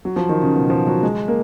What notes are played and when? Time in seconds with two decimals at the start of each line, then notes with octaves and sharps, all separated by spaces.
0.05 F#3
0.16 F3
0.29 D#3
0.42 C#3
0.54 B2
0.70 F3
0.87 F#3
1.03 G#3
1.28 A#3